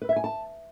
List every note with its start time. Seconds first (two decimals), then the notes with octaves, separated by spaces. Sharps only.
0.02 B4
0.09 E5
0.16 G#5
0.24 A5